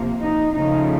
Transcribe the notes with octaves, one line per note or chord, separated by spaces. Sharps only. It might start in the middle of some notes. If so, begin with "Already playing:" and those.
Already playing: C3 F3 A#3
D#4
C#3 F3 A3 D#4